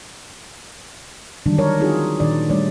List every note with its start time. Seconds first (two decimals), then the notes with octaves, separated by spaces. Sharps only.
1.46 D3 D#3 F#3 G3 D4
1.58 A#4 C#5 D5
1.80 C4 D#4 F4 F#4 G#4
2.20 A#2 D#3 D4 D5
2.49 G3 A3 D4 C#5 D5